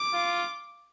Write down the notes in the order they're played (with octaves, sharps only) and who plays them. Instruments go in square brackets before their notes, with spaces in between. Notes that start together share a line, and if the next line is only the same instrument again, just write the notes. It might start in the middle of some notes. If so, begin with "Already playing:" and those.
Already playing: [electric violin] D6
[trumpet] F4